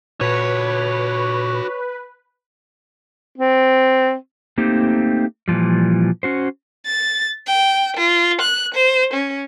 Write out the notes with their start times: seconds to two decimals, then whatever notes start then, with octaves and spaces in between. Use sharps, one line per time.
0.21 A#2 F#4 A4 B4 C#5
3.38 C4
4.58 A3 A#3 C4 D#4 G4
5.48 A#2 E3 F3 G3
6.23 C#4 F#4 C5
6.86 A6
7.46 G5
7.96 F4
8.41 F#6
8.74 C5
9.13 C#4